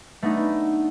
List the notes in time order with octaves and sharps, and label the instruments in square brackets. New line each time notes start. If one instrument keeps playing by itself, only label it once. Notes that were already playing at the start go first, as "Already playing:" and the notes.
[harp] A3 B3 D4 D#4